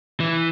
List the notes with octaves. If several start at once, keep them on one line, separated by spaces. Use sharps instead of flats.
E3